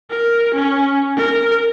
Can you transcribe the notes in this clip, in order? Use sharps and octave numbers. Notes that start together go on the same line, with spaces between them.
A#4
C#4
A#4